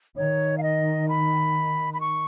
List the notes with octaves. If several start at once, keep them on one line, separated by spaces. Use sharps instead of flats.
D#3 C#5
F5
D#5
B5
B5
C#6